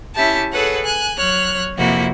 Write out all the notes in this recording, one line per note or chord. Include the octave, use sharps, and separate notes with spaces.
C#4 E4 G4 E5 A5
G#4 A4 B4 C#5 F#5
G#5 F#6
F#3 C#5 F6 F#6
F2 C3 A#3 E4 F#4